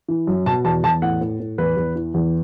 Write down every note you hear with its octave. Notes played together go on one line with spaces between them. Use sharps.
E3
F#2
B2 A5
E2 A5
E2 A5
A2 F#5
A2
A2
E2 B4
E2
E3
E2